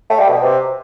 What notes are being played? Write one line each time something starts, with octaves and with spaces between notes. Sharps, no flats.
A3
G3
B2
C3